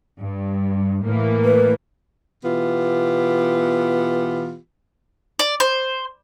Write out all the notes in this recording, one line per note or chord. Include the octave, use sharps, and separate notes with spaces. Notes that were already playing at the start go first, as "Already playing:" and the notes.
G2
A2 E3 A#3
B4
B2 E3 B3 F4 G4
D5
C5